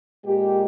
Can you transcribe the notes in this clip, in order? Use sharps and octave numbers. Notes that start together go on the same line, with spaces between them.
A#2 G#3 G4